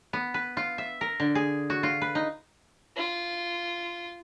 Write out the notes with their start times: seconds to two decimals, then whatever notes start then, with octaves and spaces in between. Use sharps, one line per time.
0.13 B3
0.34 B4
0.57 F4
0.78 E5
1.01 A#4
1.20 D3
1.35 G#4
1.70 F#4
1.83 F4
2.02 B4
2.15 D#4
2.97 F4